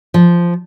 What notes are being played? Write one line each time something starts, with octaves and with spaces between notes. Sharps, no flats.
F3